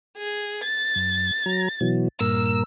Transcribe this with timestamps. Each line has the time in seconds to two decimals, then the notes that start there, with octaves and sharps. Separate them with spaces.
0.18 G#4
0.64 A6
0.96 F#2
1.46 F#3 A#5
1.81 B2 E3 F#3
2.21 G2 A#2 A#4 E6